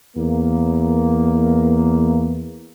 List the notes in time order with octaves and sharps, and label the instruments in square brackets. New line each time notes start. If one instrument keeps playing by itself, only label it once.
[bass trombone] E2 [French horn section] A#3